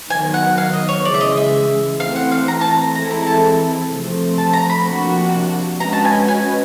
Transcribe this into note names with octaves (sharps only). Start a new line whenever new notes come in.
D#3 F#3 B3 G#5
F#5
F5
D#5
C#5
C#3 E3 G#3 D5
E5
D#5
E5
E3 A3 C4 F5
F#5
F5
A#5
A5
A#5
E3 G#3 C4 E4 A4 A#5
A#5
A5
C3 F3 A3 C4
A5
A#5
B5
C3 F3 A#3 D4 F#4
G#3 C#4 F#4 B4 D#5 A#5
A5
G#5
G#5